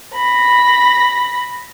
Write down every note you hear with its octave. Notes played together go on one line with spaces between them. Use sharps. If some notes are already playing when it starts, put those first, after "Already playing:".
B5 A#6